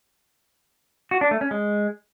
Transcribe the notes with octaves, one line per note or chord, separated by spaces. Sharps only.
F#4
D4
A3
C#4
G#3